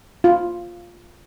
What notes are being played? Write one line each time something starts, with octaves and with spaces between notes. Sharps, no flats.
F4